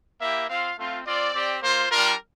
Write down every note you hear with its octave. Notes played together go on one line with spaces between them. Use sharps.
A#3 E4 G4 E5
C4 F4 F5
A3 C4 F4
C4 F4 D5
C4 G4
A#3 F4 C5
G3 D4 F4 A#4